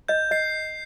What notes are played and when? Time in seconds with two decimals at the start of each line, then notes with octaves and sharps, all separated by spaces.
0.08 D#5 G6
0.31 D#5 C7